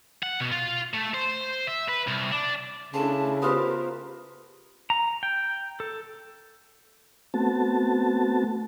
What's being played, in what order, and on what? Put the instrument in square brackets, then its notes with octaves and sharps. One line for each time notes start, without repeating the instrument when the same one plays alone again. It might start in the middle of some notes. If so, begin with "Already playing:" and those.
[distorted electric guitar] F#5
B2
F4
A3
C5
E5
B4
C2
D4
[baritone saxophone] C#3 [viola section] A3 D4 E4 [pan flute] A5 [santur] C6
[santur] B3 F4 [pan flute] G4 [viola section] A#4 C5
[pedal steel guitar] A#5
G5
A4
[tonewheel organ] A3 B3 C4 F#4 A5